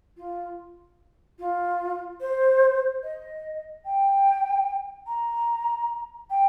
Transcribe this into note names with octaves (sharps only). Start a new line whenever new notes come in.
F4
F4
C5
D#5
G5
A#5
G5